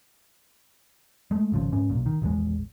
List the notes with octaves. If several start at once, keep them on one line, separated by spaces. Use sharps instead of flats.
G#3 A3
G#1 C#3 F3
G#2 C#4
B1 A#2
D#3
A#1 E2 D#3 G#3